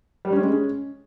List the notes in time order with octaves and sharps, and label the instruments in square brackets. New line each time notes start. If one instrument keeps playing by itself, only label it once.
[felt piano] G3
C#4
G#3
C#4